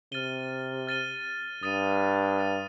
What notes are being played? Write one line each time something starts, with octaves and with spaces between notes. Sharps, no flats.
C3 F6 A6 D#7 G7
F6 A6 D#7 G7
G2 D#6 A6 D#7
D#6 A6 D#7